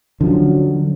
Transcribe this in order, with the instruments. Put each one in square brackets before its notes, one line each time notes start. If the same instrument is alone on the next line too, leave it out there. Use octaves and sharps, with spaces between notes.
[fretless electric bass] D3 F3 C#4 [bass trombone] F#3